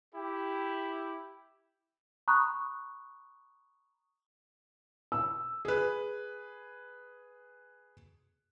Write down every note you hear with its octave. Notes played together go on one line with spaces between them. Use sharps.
E4 G4
A#5 B5 C#6 D#6 F#6
E6
G#4 B4